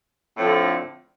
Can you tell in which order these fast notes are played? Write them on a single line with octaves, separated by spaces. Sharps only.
A2 C4 F3 D3